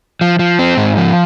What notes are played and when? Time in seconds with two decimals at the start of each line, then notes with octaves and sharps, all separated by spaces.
0.21 F3
0.39 F3
0.59 C4
0.77 G#2
0.97 F3